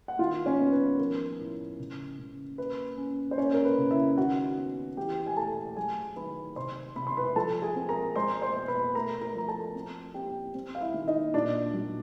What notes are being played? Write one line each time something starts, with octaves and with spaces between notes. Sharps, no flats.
F#5
D#3 F4 F5
C#4 C#5
B3
B4
F3 A#4
A2
C#3
C#3
A#3 B4
C#4
C5
A#3 C#4 C#5
A#4
B4
C#3
E4 E5
D#3 F#4 F#5
B3
E3 G4 G5
G#5
A3 A4 A5
F#3 G#4 G#5
D#3 B4 B5
C3 C5 C6
C3 B5
C6
B4 B5
F3 A4 A5
G#4 G#5
C4
A#4 A#5
G#3 C5 C6
C5 C6
B2
B4 B5
A3 A#4 A#5
A#4 A#5
F3 A#5
A4 A5
C4
C4 G4 G5
C4
F5
E4 E5
D#3
D#4 D#5
A#2 D4 D5
F#3